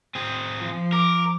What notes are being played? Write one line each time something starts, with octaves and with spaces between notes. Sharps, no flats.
C4 G#4
F3
A#4 D6